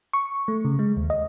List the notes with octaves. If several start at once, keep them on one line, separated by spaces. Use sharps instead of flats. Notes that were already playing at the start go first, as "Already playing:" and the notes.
C#6
A3
C#3
G#3
D#2
D#5